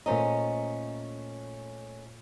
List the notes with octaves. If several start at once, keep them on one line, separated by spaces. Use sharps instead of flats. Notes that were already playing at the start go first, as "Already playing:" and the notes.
A#2 A3 C#4 C5 D#5 A#5